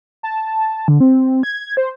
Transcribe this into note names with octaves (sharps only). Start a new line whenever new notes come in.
A5
D3
C4
G#6
C5